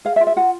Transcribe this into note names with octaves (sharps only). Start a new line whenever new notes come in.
G#4 F5
E5
F4
E5
F4 F#5